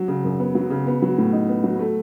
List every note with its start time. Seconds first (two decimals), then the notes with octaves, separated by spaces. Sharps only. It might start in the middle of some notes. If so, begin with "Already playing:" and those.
Already playing: F#3
0.08 C#3
0.24 F#2
0.40 B3
0.55 F#3
0.70 C#3
0.87 B3
1.02 F#3
1.18 A2
1.32 D#4
1.49 B3
1.64 F#3
1.79 A3